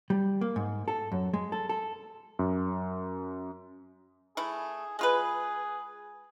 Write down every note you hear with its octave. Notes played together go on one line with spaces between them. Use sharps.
G3
A#3
G#2
A4
F#2
G#3
A4
A4
F#2
A3 E4 G#4
G#3 F4 G#4 B4